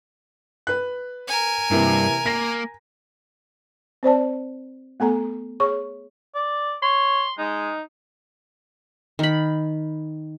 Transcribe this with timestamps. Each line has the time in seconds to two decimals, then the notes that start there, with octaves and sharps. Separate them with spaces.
0.67 B4 F#6
1.28 A#4 G#5
1.71 G2 C3 E3 A#3
2.26 A#3 A#6
4.03 C4 C5 D5 A5
5.00 A3 B3 A4 A#5
5.60 G#4 C#5 C#6
6.35 D5
6.82 C#5 C6
7.38 G#3 D#4
9.19 D#3 B5